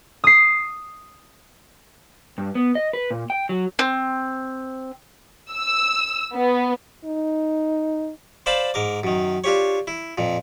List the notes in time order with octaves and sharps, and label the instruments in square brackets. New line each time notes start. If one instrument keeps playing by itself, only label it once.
[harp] D#6 C7
[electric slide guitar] G2
B3
D#5
B4
A#2
G5
F#3
[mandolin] C4
[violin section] E6
B3
[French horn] D#4
[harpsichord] C5 D5 F5 G5 A5 B5
G#2 A#4 D6
F#2 D#3
D4 F4 G4 C#5
E4
F2 A#2